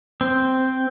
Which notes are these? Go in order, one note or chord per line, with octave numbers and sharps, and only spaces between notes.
C4